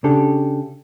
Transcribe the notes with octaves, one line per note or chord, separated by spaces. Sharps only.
C#3 D4 G4 A4